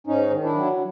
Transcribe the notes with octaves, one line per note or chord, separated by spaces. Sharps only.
G#2 C#4 D#4
D#3
D4 E4
F#3